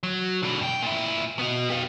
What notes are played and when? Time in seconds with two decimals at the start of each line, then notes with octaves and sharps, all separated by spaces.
0.03 F#3
0.43 B2 D3
0.61 G2 G5
0.83 A#2 E4
1.39 B3 F#4
1.70 G4 F5